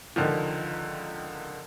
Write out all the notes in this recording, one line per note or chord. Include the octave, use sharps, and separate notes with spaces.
C#2 D3 D#3 F3